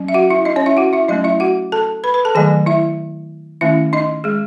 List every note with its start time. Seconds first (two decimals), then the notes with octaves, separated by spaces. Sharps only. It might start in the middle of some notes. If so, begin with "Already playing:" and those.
Already playing: F#3 C#4
0.08 E5
0.14 F#4 F#5
0.30 E4 E5
0.45 D#4 D#5
0.56 C#4 C#5
0.66 E4 E5
0.77 F#4 F#5
0.93 E4 E5
1.08 F#3 A3 C#4 D#4 D#5
1.24 E4 E5
1.40 F#4 F#5
1.72 A4 A5
2.04 B4 B5
2.14 B4 B5
2.25 A4 A5
2.35 D#3 F#3 A3 G#4 G#5
2.66 E4 E5
3.61 D#3 A3 C#4 E4 E5
3.93 D#4 D#5
4.24 G#3 G#4